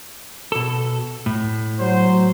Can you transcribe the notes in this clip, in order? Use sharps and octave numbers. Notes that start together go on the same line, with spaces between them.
B2 A4
A2
F#3 C5